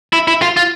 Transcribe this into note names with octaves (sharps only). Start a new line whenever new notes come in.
E4
E4
F4
F4